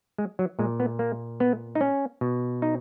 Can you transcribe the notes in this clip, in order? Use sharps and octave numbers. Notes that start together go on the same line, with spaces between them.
G#3
F#3
A#2 G#3
B3
A#3
B3
D#4
C#4
B2
D#4